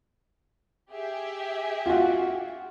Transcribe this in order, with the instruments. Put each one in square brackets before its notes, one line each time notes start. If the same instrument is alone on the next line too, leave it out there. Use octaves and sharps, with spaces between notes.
[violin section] G4 G#4 E5
[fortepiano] F4 F#4